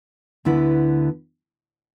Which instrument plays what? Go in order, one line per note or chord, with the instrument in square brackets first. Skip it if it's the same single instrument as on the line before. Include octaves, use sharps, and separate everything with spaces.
[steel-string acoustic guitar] D2 D3 B3 E4 B4